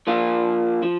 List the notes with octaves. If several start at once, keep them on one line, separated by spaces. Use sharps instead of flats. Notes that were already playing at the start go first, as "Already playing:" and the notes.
F3 A#3 D4 F4
F3